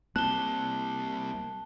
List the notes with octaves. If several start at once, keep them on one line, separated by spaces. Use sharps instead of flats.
G3 A#3 C4 A5 F#6 G7